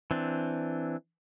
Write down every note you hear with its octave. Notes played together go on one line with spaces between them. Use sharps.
E3 C4 D4